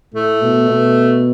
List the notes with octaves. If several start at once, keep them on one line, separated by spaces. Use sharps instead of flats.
A2 A3
B2
B2